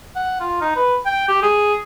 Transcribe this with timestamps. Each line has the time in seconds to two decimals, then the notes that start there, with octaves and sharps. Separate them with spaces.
0.16 F#5
0.40 F4
0.61 D#4
0.76 B4
1.06 G5
1.28 G4
1.42 G#4